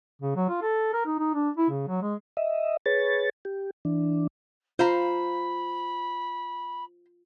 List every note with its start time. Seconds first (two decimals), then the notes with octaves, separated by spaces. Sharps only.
0.22 C#3
0.36 F#3
0.49 F4
0.62 A4
0.93 A#4
1.06 D#4
1.19 D#4
1.34 D4
1.57 E4
1.70 C#3
1.88 F#3
2.02 G#3
2.37 D#5 E5
2.86 G#4 B4 C#5 A6
3.45 G4
3.85 E3 D4
4.79 F4 C5 F5 A#5 B5